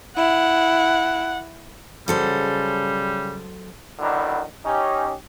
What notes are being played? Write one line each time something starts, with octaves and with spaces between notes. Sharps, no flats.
E4 F#5
C#3 F#3 G3 A4 C5
D3 D#3 F#3 B3 D4 E4
C#4 D#4 G4